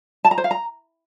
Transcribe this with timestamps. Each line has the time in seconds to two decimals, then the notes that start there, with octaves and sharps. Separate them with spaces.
0.25 A5
0.31 A#5
0.38 C5
0.44 F5
0.51 A#5